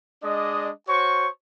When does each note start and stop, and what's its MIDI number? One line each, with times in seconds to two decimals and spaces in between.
0.23 0.70 56
0.23 0.70 62
0.23 0.70 74
0.23 0.70 75
0.23 0.70 87
0.89 1.28 66
0.89 1.28 72
0.89 1.28 73
0.89 1.28 85